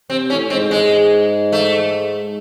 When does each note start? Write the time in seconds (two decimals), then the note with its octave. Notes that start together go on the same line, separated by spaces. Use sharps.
0.10 C3 C4
0.30 A2 C#4
0.50 G#2 C4
0.71 G#3
1.52 A3